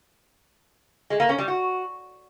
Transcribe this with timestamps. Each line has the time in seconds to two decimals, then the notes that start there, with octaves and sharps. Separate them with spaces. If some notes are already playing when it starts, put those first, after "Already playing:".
1.10 G#3
1.20 A#3
1.29 C#4
1.38 G3
1.48 F#4